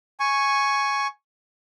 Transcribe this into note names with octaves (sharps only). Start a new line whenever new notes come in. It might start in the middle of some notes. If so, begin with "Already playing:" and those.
G#5 C#6